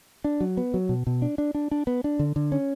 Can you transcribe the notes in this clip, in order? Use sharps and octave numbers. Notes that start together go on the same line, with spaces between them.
D4
F#3
B3
F#3
B2
B2
D4
D4
D4
D4
B3
D4
D3
D3
C#4